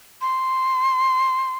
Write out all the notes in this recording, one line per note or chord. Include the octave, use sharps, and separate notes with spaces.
C6